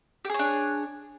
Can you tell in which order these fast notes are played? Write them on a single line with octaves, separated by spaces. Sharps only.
G4 G#4 C#5 D4